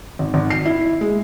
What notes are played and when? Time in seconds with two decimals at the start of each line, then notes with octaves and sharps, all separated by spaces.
0.19 G#1
0.34 G#1
0.50 C7
0.65 E4
1.01 G#3